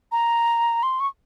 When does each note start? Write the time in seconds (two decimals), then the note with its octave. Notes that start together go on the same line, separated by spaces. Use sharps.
0.12 A#5
0.83 C6
1.00 C#6